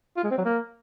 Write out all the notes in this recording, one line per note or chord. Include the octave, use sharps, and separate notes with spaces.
F4
G#3
C4
F#3
A#3